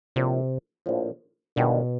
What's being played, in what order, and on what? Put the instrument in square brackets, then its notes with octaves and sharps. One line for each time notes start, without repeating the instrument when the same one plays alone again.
[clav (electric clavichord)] A#1 A2 F3 [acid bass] C3
[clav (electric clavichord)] A#1 A2 F3
[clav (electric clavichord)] G1 G2 D#3 G#3 B3 [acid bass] B2